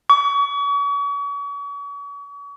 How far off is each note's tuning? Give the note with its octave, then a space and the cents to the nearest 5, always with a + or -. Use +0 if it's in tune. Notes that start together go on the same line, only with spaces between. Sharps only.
C#6 +40